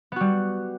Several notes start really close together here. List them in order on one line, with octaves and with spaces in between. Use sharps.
B3 F#4 G3